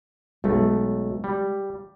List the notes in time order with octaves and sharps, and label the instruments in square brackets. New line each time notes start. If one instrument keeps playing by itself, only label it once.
[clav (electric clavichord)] B1 A3 [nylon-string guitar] G#3
[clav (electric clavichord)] G3